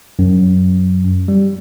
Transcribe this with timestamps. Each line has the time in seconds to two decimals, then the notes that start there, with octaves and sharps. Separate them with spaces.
0.19 F#2
1.28 G3